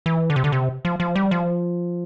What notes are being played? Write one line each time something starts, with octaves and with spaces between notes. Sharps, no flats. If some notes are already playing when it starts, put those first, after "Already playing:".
E3
D3
C3
D3
C3
F3
F3
G3
F3